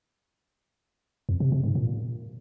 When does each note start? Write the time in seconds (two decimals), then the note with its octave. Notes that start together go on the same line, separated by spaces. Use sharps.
1.29 F2
1.40 C3
1.52 C3
1.64 G#2
1.75 A#2